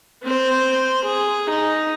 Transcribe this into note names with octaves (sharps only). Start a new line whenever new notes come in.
C4 C5
G#4
D#4